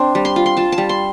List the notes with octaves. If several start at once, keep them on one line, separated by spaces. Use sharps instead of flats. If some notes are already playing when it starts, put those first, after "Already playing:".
Already playing: C4 D4 C5
G3
C6
F4
C6
F4 A5
A5
G3
C6